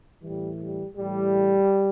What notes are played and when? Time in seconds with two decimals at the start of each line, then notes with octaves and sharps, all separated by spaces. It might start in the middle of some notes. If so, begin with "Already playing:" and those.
0.23 A2 E3 G3
0.59 G3
0.97 A2 E3 G3